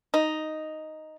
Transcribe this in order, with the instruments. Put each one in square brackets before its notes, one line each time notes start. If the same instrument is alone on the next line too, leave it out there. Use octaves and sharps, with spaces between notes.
[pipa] D#4